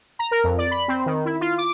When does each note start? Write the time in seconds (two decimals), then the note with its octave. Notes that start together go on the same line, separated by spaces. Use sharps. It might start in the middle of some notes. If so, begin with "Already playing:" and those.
0.19 A#5
0.31 A#4
0.44 F2
0.58 D5
0.71 B5
0.88 C4
1.06 D#3
1.25 E4
1.41 F4
1.58 D6